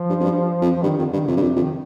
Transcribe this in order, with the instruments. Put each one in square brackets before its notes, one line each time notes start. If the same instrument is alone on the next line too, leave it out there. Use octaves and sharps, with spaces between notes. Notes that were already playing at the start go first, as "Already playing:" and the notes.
Already playing: [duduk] F3
[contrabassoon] G2
F2
G2
F2
[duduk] F3
[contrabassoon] G2 [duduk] D#3
[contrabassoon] F2 [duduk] D#3
[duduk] D3
[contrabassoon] G2 [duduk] D#3
[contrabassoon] F2 [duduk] C3
[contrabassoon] G2
F2
F2
[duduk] D#3